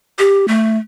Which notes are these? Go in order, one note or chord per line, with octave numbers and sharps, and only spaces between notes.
G4
A3